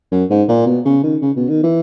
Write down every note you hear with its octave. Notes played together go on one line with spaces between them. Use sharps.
F#2
G#2
A#2
B2
C#3
D#3
C#3
B2
D#3
E3